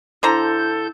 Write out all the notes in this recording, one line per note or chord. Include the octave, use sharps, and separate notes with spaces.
D3 E4 A4 C5 A#5 G6